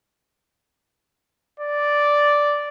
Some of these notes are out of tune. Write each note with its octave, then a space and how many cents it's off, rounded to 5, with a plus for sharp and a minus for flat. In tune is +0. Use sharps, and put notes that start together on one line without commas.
D5 -5